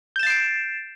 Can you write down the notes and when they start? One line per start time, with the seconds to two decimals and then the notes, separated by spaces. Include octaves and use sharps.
0.16 G6
0.19 E7
0.23 A6
0.27 C7
0.30 D7